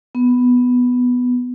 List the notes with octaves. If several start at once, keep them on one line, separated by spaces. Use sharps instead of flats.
B3